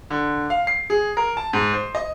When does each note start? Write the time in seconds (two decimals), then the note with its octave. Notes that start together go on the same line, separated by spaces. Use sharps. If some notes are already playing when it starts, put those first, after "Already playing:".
0.10 D3
0.50 F5
0.67 C7
0.90 G#4
1.17 A#4
1.37 A5
1.53 G#2
1.73 C5
1.95 D#5